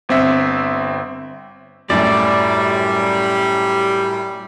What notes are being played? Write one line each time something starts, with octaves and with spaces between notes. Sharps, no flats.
G1 C4 E5
F#2 A2 G3 D5